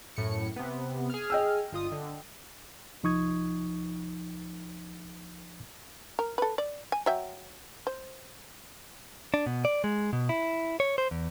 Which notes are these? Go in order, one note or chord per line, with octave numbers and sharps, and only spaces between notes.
F#2 A2 C#7
C3 B3
G#4 F6
D#5 G5 E6
G1 F4 D#6
D3
C2 F3 D#4 C#6 D#6 G#6
A#4
A4 B4
D5
G#5
F#3 E5 G5
C5
D4
B2
D5
G#3
B2
E4
C#5
C5
E2